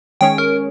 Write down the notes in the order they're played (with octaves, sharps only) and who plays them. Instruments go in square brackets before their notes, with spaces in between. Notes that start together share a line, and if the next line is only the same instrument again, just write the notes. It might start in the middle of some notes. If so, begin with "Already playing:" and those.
[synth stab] D#3 G#3 C#4 G#4 C#5 [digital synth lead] G5
[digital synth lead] A#4